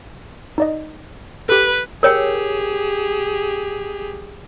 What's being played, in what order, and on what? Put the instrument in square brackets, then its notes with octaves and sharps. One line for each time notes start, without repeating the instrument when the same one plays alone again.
[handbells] D#4 D5 D#5
[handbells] G4 A4 [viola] B4
[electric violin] G4 G#4 [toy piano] A#4 C#5 G5